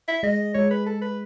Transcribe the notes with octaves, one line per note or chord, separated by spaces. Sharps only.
E5
G#3 D#5
G#3 C#5
B4
A4
B4